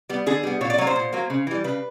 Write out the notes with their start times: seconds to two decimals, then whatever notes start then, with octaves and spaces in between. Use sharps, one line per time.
0.09 G3 B3
0.26 D3 G#4
0.43 G3 B3
0.61 A#2 C#5
0.70 D5
0.78 F#3 C#5
0.81 A#3
0.87 C5
0.96 A#2
1.13 F#3 A#3
1.30 C#3
1.47 E3 G3
1.64 C#3 B4